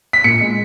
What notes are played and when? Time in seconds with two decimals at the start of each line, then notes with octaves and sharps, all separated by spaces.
0.13 B6
0.24 A#2 C#7
0.41 G#3